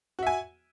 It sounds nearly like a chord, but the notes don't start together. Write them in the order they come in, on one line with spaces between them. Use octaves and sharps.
F#4 E5 G#5